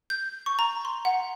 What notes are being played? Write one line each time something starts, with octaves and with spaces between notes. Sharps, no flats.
G6
C#6
A#5
C6
F#5